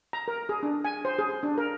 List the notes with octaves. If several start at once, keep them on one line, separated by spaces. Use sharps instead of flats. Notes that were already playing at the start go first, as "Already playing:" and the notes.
A#5
A#4
G#4
D4
G#5
C5
G#4
D4
A#4